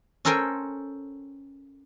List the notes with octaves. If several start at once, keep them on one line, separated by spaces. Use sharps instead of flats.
C#4 A4 A#4 C5 G5 G#5